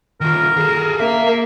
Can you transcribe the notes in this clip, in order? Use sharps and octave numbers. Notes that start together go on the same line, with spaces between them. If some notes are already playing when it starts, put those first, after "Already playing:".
D#3 F4 A#4
G#4 A4
A#3 E5